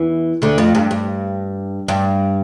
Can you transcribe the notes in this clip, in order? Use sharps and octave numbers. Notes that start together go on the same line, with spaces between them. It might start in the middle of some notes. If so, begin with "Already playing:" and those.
Already playing: E2 E3
D2 D3
F2
G2
G2
G2